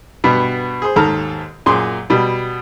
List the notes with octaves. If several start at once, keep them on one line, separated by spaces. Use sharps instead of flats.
G2 B2 B3
G#4 C5
D#2 G#2 A4 A#5 F6
F#2 A#2 G#4 C6
B2 G3